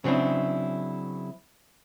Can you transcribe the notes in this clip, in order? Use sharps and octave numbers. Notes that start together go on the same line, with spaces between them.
C#3 F#3 C4 D4 E4